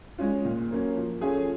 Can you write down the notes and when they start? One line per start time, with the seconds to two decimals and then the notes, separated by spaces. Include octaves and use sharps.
0.18 G#3 C#4 F4
0.45 A#2
0.70 F#3 A#3 C#4
0.96 F3
1.21 A3 C#4 F4 G#4